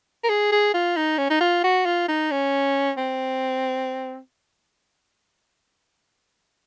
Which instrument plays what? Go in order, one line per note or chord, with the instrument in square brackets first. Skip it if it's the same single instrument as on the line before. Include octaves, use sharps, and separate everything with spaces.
[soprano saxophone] A#4
G#4
G#4
F4
D#4
C#4
D#4
F4
F#4
F4
D#4
C#4
C4